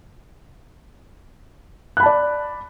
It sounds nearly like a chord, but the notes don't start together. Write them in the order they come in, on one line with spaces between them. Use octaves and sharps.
F#6 B5 A5 D5